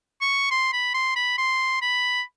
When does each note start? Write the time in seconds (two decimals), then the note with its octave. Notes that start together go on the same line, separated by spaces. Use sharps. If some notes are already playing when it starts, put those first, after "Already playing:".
0.22 C#6
0.51 C6
0.73 B5
0.95 C6
1.16 B5
1.38 C6
1.82 B5